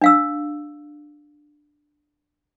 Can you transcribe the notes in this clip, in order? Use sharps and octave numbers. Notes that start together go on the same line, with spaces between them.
D4 F5 E6